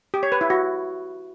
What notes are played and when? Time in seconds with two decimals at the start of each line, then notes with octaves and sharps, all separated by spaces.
0.14 G4
0.23 C#5
0.32 B4
0.41 E4
0.50 F#4